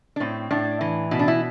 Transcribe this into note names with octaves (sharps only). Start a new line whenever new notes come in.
D4
A2 C4
A2 D4
E3
B2 E4
D4
E4